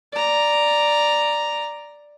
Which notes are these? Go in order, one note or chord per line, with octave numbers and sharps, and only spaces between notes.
D5 A#5